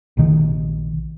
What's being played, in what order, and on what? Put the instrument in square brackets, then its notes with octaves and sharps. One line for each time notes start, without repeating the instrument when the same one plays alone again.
[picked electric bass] A#1 C3 D#3